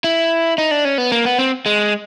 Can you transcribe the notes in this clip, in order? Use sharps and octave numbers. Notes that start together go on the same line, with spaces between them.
E4
D#4
D4
C#4
B3
A#3
B3
C4
G#3